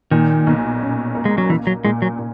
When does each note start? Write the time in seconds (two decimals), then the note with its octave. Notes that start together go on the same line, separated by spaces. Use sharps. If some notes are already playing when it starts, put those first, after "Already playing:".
0.11 A#2 D#3
0.47 B1
0.81 C#4
1.15 A#3
1.25 G#3
1.38 F#3
1.50 E3 A#3
1.67 F#3
1.85 A#2 G#3
2.02 F#3
2.19 A#2